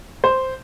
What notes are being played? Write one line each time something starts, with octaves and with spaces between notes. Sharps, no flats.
C5